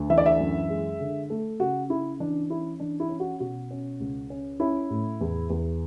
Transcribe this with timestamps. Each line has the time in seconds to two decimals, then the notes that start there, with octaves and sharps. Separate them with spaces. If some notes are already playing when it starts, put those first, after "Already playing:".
Already playing: D2
0.10 E3 E5
0.18 D5
0.26 E5
0.40 F#2
0.70 G#3
1.00 D3
1.30 A3
1.59 C#3 F#4
1.90 C#3 E4
2.20 E3 D4
2.50 C#4 E4
2.80 E3 D4
3.00 E4
3.10 C#4
3.20 F#4
3.40 B2 F#4
3.71 C#4
4.00 C#2
4.30 C#4
4.60 C#4 E4
4.90 A2
5.21 E2
5.50 E2